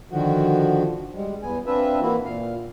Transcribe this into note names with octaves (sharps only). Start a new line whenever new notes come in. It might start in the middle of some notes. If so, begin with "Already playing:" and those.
D3 D#3 F3 F#4
G3 G#3
E2 B3 G#5
C4 D4 F4 B4 E5
E3 A#3 E4 F#4
A#2 F5